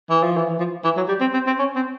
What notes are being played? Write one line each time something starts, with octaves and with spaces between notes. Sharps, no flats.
E3
F3
E3
E3
F3
E3
F#3
G3
C4
C4
C4
C#4
C4